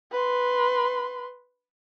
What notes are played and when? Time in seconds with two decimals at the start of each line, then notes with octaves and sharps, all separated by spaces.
0.12 B4 C6